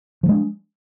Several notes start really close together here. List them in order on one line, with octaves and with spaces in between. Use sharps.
F3 F#3 G#3 D4